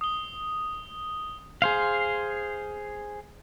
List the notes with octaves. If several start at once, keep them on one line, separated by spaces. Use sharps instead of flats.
D#6 G7
G#4 C5 F5